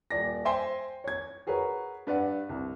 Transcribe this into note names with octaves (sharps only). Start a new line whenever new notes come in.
D#1 D5 A#6
C5 E5 G5 G#5 C6
C#5 G#6
F#4 G#4 A#4 B4 C#5
G2 B4 D5 F#5
C2